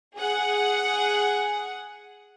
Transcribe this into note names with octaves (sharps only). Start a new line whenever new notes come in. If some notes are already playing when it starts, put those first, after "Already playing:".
G#4 F#5